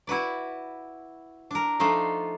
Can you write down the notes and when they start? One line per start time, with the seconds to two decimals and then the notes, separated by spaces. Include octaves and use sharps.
0.07 E4 F#4 B4 D5
1.51 D4 A#4
1.80 F3 A3 D4 D#4 F4